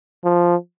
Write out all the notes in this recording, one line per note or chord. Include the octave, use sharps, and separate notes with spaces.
F3